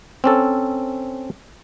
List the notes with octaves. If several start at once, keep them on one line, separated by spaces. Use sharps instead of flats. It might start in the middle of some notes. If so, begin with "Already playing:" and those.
C4 C#4 A4